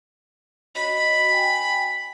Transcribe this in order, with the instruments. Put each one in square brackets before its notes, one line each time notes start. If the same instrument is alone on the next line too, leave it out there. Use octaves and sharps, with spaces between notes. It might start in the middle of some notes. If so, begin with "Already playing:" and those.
[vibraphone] F#4 C#5 D#5 [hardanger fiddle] B5
[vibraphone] G5 G#5